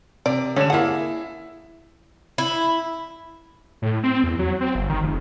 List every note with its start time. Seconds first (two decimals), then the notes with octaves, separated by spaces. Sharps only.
0.26 C3 D5
0.56 D3 G3 C#4 C#5 E7
0.70 A#3 E4 G#4 F#5
2.38 E4
3.82 A2
4.03 C4
4.24 E2
4.39 F#3
4.61 C4
4.75 G1
4.90 D#3
5.03 F1